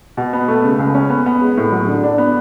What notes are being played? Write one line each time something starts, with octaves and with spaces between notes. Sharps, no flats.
B2
B3
A3
C#3
C#2
C#4
B3
B3
G#3
A2
F#3
D3
D4
B3